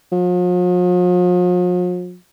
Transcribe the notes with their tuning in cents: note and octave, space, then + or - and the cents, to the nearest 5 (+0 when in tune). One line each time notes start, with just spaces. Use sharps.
F3 +45